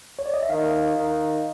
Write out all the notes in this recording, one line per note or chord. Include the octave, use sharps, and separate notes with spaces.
C#5
D5
D#5
E5
D#3 F5
D#3